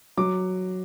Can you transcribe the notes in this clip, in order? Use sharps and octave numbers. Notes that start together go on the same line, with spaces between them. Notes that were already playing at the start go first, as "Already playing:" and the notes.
F#3 D6